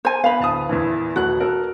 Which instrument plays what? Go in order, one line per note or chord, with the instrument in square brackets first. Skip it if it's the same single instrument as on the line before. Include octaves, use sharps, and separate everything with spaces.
[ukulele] C5 G#5
[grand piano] B3 F7 [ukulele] F5 B5
[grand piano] D1 A5 D#6
E2 A#2 E3
[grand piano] D#1 A3 F#6 [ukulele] F#4
[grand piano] A4 A#4